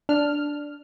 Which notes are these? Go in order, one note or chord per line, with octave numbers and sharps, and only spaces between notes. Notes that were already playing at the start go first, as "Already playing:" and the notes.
D4 F6